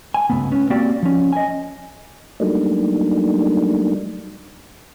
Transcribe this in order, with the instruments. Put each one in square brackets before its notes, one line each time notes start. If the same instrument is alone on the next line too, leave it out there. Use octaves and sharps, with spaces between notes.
[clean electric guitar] G#5
C#2 G2 A3 B3
B3 C#4
A#3 C4 F#4 G4 D5 G5
F3 C#4
D#5 G#5
[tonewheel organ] F#3 G3 A3 A#3 D4 D#4